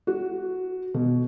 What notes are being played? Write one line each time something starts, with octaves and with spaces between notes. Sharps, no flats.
F#4
B2